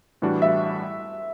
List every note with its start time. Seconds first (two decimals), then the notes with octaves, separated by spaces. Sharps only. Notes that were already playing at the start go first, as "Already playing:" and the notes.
0.22 A2 E3 G3 D4 F#4
0.42 E5